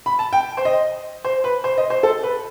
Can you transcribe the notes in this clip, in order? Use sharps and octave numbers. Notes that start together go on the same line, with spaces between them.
B5
A5
G5
C5
D#5
C5
B4
C5
D#5
C5
A4
B4